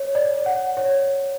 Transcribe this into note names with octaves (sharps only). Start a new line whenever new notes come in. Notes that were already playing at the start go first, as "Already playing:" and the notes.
Already playing: C#5
D5
F#5
C#5